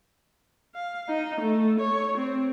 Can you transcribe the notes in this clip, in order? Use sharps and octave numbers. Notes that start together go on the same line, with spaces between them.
F5
D#4
A3
C#5
C4